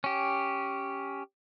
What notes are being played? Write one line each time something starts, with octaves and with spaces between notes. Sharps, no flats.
C#4 G4